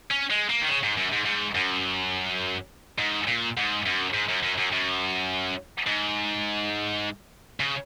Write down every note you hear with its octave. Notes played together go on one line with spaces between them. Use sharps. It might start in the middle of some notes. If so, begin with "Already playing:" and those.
C#4
G#3
A#3
D#3
C#3
G#2
F#2
G#2
G#2
F#2
G#2
A#2
G#2
F#2
G#2
F#2
F#2
F#2
F#2
G#2
C#3